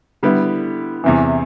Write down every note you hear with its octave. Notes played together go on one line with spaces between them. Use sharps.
D3 G3 B3 E4
E2 C3 E3